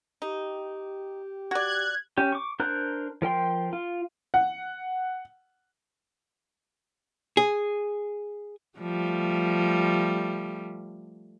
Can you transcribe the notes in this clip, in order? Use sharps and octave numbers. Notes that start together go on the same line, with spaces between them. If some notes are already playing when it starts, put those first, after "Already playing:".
D#4 G4
F#4 D5 F#6 G#6
C#4 G4
C#6 D6
D4 A#4 C5 A#5 F#6
F3 A#4 G5 C6
F4
F#5
G#4
F3 G3 A3